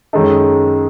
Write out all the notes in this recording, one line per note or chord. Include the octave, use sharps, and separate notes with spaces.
F#2 D#3 G#3 D#4 A4